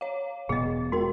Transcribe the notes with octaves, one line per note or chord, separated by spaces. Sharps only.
C#5 F5
E1 B2 B3 G#4 D#5
G#3 F#4 A#4 G5